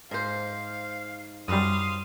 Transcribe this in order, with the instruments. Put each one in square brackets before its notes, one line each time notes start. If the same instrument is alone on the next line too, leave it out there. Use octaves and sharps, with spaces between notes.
[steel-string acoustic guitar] G#2 C5 [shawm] F5
[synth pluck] F#2 G3 [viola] F5 C6 [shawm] D#6